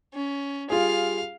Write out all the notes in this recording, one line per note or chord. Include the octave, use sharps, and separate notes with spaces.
C#4
G3 F4 G#4 F5